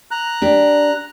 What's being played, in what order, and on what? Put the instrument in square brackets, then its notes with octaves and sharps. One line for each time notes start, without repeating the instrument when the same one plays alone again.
[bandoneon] A#5 F#6
[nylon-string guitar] D4 G4